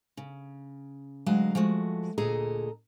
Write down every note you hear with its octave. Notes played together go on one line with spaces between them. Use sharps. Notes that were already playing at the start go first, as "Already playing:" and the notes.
C#3
D2 F#3 G#3 D#5 F5
F3 G#3 A3 F#4
D2 A#2 G#4 A4 D#5 A#5